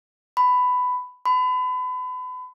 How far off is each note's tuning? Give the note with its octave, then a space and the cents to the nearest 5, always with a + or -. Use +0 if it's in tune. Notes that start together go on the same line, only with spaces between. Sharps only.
B5 +15
B5 +35